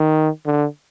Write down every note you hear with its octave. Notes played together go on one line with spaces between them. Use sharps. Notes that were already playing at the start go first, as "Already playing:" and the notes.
Already playing: D#3
D3